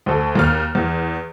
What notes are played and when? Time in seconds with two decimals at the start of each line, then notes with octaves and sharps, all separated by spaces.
0.06 D2 A4
0.35 D#2 F6
0.75 E2